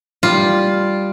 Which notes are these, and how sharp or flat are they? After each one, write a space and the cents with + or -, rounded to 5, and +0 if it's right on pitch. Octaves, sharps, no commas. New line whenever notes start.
G3 +0 F4 +0